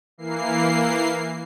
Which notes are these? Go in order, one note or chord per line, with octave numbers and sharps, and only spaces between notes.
E3 A#3 C7